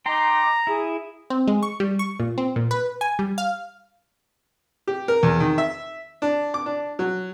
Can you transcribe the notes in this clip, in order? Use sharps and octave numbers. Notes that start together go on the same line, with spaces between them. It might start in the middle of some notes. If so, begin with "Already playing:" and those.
D#4 G5 A#5 C6 D6
E4 G#4
C4
G#3
C#6
G3
C#6
A#2
C4
A#2
B4
G#5
G3
F5
G4
A#4
E2
D#3
E5
D4
D6
D4
F#3